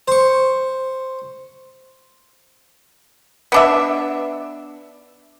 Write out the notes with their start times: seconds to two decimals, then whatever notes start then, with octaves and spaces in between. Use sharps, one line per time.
0.08 C5 C#6
3.52 B3 D4 E5